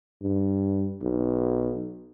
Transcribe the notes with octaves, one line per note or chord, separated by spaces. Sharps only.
G2
B1